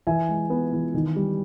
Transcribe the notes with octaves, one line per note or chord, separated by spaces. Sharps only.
E3 E5 G#5
G#3
B3
E3
D#3
G3